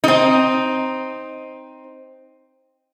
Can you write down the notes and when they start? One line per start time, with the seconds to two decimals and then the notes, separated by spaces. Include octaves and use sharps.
0.04 C4 D#4